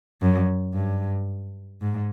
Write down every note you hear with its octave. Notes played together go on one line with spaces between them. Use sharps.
F#2
G2
G#2